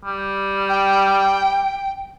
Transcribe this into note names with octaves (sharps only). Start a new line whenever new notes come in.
G3
G5